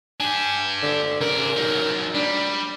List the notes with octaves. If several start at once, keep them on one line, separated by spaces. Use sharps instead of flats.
D4 G4 G#5
D3
C#3 A#4 D5
F#3 D#4
G3 D4